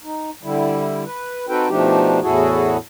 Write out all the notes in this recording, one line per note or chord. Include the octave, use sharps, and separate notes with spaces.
D#4
D3 G3 E4
B4
C4 D#4 F#4 A4 B4 G5
B2 F3 A3 D4 D#4 G4
E2 A2 E4 F#4 G#4 A4